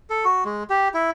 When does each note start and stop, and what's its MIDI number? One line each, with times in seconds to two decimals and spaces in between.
0.10 0.25 69
0.25 0.44 66
0.45 0.64 56
0.70 0.88 67
0.94 1.10 64